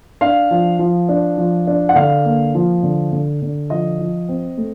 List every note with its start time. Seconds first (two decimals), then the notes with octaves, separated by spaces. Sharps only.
0.21 D4 F5
0.51 F3
0.79 F3
1.09 D4
1.38 F3
1.67 D4
1.89 F#5
1.95 D3 F5
2.25 A#3
2.55 F3
2.83 D3
3.12 D3
3.42 D3
3.70 F3 D#5
3.99 F3
4.29 C4
4.57 A3